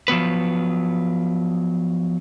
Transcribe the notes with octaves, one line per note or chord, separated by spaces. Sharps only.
F3 F#3 B3 B4